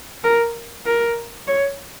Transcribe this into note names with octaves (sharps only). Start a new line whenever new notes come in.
A#4
A#4
C#5